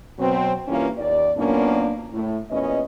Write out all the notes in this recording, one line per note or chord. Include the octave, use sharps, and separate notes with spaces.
B2 F#3 C4
G2 E3 A#3 C#4 F4 A#4
D#2 D5
F#2 A#2 A#3 B3 C#4 D4
A2
E2 A#2 C#4 B4 D#5